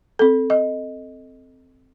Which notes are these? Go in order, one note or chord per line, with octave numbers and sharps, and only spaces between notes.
C4 A4
D#5